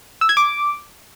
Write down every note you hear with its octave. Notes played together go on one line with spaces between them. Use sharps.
E6
G#6
D6